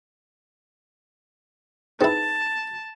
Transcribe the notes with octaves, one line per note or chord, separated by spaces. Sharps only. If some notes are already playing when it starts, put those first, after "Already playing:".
C4 D#4 E4 G#4 B4 A5